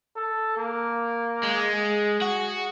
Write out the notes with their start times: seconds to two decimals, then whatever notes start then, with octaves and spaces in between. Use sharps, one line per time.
0.16 A4
0.57 A#3
1.43 G#3
1.73 G#4
2.22 F#4